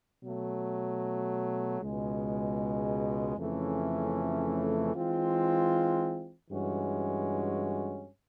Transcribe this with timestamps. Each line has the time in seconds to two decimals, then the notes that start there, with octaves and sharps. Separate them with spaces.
0.22 B2 F#3 A3
1.80 C#2 B2 G#3
3.36 F2 C#3 E3 A3 C#4
4.93 E3 G#3 C4 F4
6.50 G2 E3 G#3 C#4 F#4